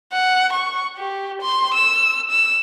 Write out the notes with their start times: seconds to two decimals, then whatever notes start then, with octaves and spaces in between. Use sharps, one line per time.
0.12 F#5
0.53 C#6
0.97 G4
1.42 C6
1.74 E6
2.31 E6